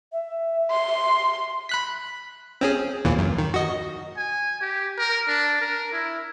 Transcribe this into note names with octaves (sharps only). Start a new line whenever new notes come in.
E5
C6
B5 F#6 B6
C4 C#4 G#4
D#2 A#2 E3
F#2
D#3
F#4 D#5
G#5
G4
A#4
D4
A#4
E4